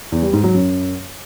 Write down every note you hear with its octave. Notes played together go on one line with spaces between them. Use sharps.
E2
G3
G#2
F#3
F#2